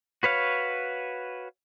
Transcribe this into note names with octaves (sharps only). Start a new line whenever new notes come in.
F#4 B4 C#5 F5